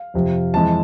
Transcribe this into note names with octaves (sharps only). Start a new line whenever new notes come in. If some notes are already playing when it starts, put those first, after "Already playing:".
Already playing: F5
F2 C3 F3
F2 E3 G#3 A5